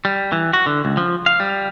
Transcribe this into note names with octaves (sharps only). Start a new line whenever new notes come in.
G3
E3
F#4
D3
C#2
F3
F5
G3